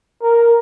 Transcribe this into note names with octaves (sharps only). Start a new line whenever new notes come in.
A#4